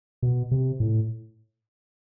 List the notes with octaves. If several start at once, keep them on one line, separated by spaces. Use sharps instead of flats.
B2
C3
A2